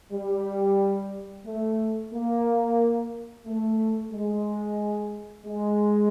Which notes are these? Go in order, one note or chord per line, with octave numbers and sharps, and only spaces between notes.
G3
A3
A#3
A3
G#3
G#3